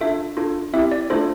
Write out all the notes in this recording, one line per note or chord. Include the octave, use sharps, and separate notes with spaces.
D4 F4 A4 E5
D4 F4 A4
C4 E4 G4 E5
D5
A3 D4 F4 A4 C5